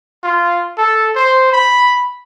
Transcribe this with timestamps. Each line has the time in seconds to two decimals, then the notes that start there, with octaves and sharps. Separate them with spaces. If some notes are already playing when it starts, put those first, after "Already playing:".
0.23 F4
0.78 A4
1.16 C5
1.52 B5